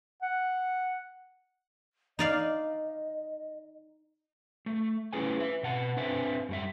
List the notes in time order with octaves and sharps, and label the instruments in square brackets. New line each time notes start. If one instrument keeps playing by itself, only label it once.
[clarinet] F#5
[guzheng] D#4 D5 F5 [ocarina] D#5
[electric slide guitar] A3
A3 C#4 E4 G#4 B4 G#5
B4 E5
B2 F#5 A5
C4 D4 B4 C5 E5 G#5
F#2 G3 E5